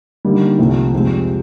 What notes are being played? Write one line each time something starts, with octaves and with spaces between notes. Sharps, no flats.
D3 G3 A#3 D#4
C2 C3 F3 A3 C4
F2 C3 F3 G#3 C4